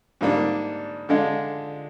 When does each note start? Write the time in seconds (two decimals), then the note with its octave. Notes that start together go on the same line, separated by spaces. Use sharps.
0.21 G#2 G3 A#3 D4
1.09 D3 G#3 D4 F4